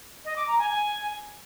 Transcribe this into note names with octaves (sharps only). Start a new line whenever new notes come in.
D#5
D6
A#5
G#5
G#5